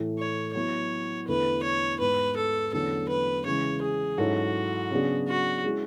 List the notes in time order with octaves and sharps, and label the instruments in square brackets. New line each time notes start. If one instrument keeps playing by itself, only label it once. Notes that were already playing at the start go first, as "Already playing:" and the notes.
Already playing: [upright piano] A2 E3 A3
[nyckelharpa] C#5
[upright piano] F#3 B3 E4 [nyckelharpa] C#5
[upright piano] E2 D3 A3 E4 A4 [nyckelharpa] B4
[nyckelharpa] C#5
[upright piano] G#2 G#3 B3 [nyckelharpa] B4
[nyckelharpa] A4
[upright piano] E2 D3 F#3 A3 C#4 [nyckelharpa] A4
[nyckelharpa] B4
[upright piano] C#3 E3 G#3 [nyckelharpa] C#5
[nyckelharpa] G#4
[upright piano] G#2 F#3 C#4 E4 A4 [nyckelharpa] F#4
[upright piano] C#3 F#3 B3 D4 G#4
[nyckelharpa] F#4
[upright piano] G#3 C#4 E4 G#4